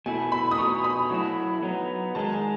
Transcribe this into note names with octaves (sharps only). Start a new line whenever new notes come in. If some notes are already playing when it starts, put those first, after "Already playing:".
B2 A3 E4 G#5
B5
D#6
B2 A3 D#4 C#6
B5
F#3 A3 E4
F#3 B3 D#4
D#3 G#3 D#4 A5
G#5